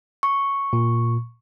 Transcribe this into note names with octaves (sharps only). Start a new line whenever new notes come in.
C#6
A#2